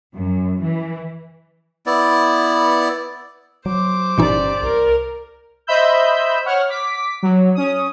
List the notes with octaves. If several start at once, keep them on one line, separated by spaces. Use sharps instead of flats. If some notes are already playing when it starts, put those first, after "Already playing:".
F#2
E3
B3 E4 D5
F#3 C5 D6
G1 A#2 E3 C#4 D#4 G4 D5
C2 A#4
C5 D#5 E5 B5 E6 G6
C#5 F#5 F6
D6 B6
F#3
C#4 D#6